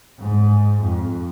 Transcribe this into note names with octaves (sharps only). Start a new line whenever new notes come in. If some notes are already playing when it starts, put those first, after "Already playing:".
G#2
F2